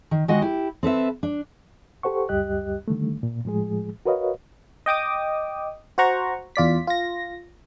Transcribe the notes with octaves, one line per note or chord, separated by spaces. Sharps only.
D#3
D#3 G#3 F#4 D#5 F#5
E4 G4
C4 A4 B4 E5
D4
G4 A4 C5 F#5 C#6
C#2 F#2 G3 G4 D#5 F#6
D3 D#3 G3 A3
A#2
A2 F3 G#3 G#4
F#4 A#4 B4 C#5 D#5 F5
D#5 G5 D6 D#6
F#4 C5 F#5 A#5 C#6
E2 F4 D5 B6
F4 A#6